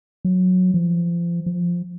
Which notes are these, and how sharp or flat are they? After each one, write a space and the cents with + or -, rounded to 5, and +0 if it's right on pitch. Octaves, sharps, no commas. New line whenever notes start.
F#3 -15
F3 -30
F3 +5